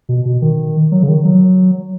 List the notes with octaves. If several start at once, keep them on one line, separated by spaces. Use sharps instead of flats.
B2
B2
D#3
F#3
C#3
D#3
F#3